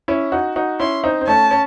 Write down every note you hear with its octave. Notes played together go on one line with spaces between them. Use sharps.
C#4 E4
D#4 F#4
D#4 F#4
C#4 E4 C6
C4 D#4
C4
A3 C#4 A5
C#4